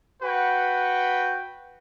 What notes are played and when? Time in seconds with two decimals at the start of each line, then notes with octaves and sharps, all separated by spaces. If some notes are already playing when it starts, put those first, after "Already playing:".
0.22 F#4 B4 F#5 G5